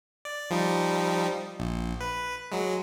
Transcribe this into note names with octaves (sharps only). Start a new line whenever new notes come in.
D5
F3 G3 D#4
A#1
B4
F#3 G#3